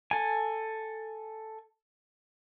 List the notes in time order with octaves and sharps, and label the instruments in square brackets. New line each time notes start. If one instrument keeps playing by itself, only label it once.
[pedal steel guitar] A4 G#5